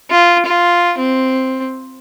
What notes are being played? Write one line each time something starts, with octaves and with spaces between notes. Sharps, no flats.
F4
F4
C4